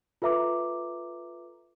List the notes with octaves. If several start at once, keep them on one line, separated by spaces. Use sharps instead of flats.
F4 A4 B4 E5 A#5 D6